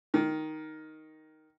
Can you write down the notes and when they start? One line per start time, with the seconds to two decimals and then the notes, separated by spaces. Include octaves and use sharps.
0.14 D#3